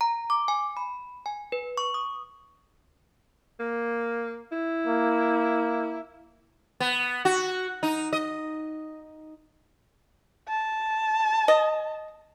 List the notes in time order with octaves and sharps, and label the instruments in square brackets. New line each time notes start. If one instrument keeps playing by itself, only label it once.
[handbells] A#5
D6
G#5
B5
G#5
B4
C#6
D#6
[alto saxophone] A#3
E4
[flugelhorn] A#3
[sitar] B3
F#4
D#4
D#5
[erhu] A5
[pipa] D#5